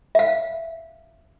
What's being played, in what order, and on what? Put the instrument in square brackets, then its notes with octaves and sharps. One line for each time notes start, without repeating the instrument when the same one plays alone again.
[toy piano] E5 F5